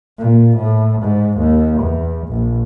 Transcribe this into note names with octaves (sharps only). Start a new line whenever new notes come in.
A#2
A2
G#2
D#2
E2
A#1